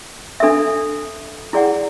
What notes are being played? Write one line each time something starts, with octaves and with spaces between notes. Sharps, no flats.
D4 A4 E5
E4 G#4 D5 F#5